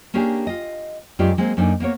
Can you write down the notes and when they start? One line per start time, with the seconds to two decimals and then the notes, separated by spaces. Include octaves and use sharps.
0.14 A#3 C#4 D4 G4 G#4
0.47 F4 D#5
1.19 F#2 G#3 A3 F4 G4 D5
1.37 F#3 G#3 A#3 C4
1.57 F#2 A#3 D4 D#4 A4 G#5
1.80 A#3 B3 A#4 C#5